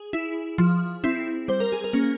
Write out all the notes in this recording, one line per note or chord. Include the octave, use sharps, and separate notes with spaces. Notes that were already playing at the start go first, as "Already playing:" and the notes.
Already playing: G#4
E4
F3
C4 E4
G3 C5
A#4
G#4
A#4
A#3 C#4